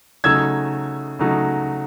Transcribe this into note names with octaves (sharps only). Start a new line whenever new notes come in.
C#3 F#3 A3 D#4 E6 G#6
C#3 F#3 A3 D#4